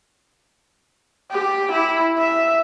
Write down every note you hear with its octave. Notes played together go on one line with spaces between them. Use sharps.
G4
E4
E5